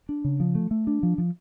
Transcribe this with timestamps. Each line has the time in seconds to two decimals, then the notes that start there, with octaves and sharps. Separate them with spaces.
0.09 D4
0.24 C#3
0.40 F3
0.55 A3
0.71 A3
0.87 D4
1.03 F3
1.18 F3